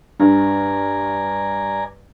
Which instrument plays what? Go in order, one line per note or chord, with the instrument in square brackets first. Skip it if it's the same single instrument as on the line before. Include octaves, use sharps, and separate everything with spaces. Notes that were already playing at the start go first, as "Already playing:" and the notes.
[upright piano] G2 [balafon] D4 [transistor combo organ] D5 G#5 A#5